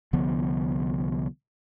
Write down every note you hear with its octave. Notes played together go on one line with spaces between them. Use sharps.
C2 D3 F3 B3